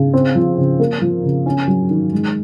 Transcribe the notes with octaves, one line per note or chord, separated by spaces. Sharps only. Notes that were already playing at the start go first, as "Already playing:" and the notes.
Already playing: C#3
C4
F3
C#3
A#3
F3
C#3
C#4
F#3
D#3
G#3